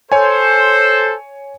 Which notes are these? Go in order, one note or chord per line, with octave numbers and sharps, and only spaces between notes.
A4 C5 C#5 G#5